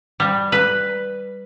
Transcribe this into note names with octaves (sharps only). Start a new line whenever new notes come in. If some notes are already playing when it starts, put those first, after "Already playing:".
G3
B4